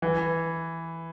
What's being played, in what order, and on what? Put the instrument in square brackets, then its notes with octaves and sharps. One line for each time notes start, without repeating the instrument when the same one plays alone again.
[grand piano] E3